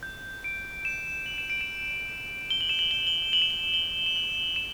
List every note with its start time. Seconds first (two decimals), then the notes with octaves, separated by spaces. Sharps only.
0.03 G6
0.44 D7
0.85 E7
1.26 F#7
1.38 E7
1.50 D7
1.61 E7
2.50 G7
2.61 F#7
2.69 E7
2.79 F#7
2.91 G7
3.07 G7
3.33 F#7
3.42 E7
3.50 F#7
3.74 G7
4.06 E7
4.16 F#7
4.56 E7